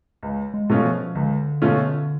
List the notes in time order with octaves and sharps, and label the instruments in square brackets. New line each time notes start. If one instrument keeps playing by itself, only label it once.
[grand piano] C#2
[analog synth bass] G#3
[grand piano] B2 A3 C#4 F4
[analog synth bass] F3
[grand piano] C#2 [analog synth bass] D3
[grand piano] B2 A3 C#4 F4